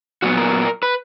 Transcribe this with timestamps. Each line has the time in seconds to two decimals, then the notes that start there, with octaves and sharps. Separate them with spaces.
0.22 A#2 F#3 B3 F#4
0.37 A#4
0.83 B4